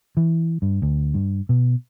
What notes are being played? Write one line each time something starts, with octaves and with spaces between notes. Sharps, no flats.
E3
G2
D2
G2
B2